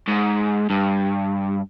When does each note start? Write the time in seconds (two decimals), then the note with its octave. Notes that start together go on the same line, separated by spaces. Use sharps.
0.08 G#2
0.70 G2